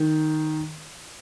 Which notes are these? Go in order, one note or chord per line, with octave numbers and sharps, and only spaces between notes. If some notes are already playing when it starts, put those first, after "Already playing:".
Already playing: D#3